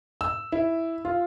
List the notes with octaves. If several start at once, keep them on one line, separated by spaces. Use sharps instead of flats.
E6
E4
F4